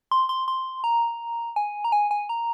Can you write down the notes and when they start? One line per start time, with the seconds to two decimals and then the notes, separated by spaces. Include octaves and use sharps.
0.11 C6
0.29 C6
0.48 C6
0.84 A#5
1.56 G#5
1.84 A#5
1.92 G#5
2.11 G#5
2.29 A#5